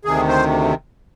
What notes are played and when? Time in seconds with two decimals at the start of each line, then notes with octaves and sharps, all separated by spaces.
0.05 D2 C3 D#3 G#4
0.28 C5